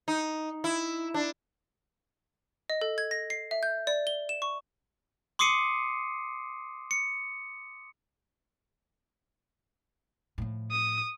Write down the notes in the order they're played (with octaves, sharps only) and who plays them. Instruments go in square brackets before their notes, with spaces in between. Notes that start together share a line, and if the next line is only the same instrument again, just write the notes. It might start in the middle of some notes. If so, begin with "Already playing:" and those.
[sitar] D#4
E4
D4
[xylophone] D#5
A4
G#6
A#6
C7
E5
G6
D5
G7
E7
C#6
[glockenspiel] C6 D6 D#6 C7 C#7 D#7
C#7
[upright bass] A2 F3
[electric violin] D#6